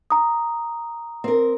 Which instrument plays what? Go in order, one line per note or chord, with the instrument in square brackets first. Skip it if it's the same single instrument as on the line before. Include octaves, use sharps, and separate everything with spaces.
[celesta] A#5 D#6
[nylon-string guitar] C4 A#4